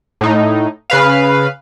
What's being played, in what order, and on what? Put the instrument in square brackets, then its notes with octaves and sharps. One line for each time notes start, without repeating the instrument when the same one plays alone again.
[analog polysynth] A2 D#4
C#3 B4 F5